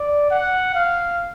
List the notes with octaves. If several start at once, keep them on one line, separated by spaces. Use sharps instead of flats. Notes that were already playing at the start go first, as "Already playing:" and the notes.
Already playing: D5
F#5
F5